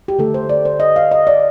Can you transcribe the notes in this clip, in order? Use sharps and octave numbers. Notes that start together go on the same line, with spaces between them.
G4
D3 A3 A4
C5
D5
C5
D#5
F5
D#5
D5